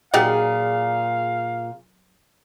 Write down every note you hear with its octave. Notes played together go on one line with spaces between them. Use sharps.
A#2 F#3 D#4 G4 G#4 F5